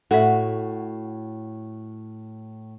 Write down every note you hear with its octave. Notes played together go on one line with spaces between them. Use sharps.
A2 F#4 A4 E5